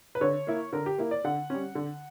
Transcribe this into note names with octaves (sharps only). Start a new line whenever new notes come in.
B4
D3 C#5
A#3 E4
D3 A#4
G4
A#3 E4
D5
D3 F#5
G3 C#4
D3